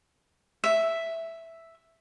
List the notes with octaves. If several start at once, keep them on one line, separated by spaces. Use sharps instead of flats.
E5